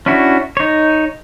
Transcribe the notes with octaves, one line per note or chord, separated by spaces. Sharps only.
C#4 D4 E4 F#4
D#4 C#5